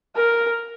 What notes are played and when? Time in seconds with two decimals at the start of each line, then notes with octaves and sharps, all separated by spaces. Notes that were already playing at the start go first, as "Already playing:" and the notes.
0.16 A#4